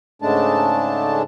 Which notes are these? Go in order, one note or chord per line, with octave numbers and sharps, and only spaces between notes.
G#2 C#3 G#3 A3 D4 A5